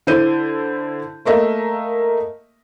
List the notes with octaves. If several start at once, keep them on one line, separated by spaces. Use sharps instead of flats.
D3 E4 C5 G6 D#7
A3 A#3 D#5 E5